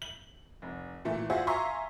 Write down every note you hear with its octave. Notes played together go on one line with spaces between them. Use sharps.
F#7
F1
A#2 E3 A3
F4 F#4 G#4 C5 E5 F#5
E5 F5 G#5 A#5 C6 C#6